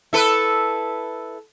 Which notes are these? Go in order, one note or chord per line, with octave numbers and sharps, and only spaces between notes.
E4 A4 B4